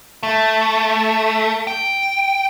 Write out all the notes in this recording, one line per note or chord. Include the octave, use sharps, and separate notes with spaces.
A3
G5